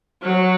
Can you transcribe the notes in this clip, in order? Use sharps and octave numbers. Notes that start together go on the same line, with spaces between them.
F#3